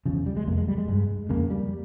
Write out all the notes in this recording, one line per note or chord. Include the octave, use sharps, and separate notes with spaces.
E2 C#3 F3
G3
G#3
F2 C3 A#3
G#3
G3
G#3
G2
F2 C#3 A#3
G3